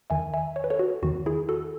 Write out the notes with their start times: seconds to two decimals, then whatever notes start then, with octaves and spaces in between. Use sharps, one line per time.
0.10 E2 D#3 E5 G#5
0.34 E5 G#5
0.56 C#5
0.64 B4
0.70 A4 C#5
0.79 F#4
1.03 E2 D#3 F#4
1.26 E4 G#4
1.49 F#4 A4